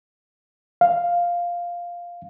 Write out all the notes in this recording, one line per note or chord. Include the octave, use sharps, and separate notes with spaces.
F5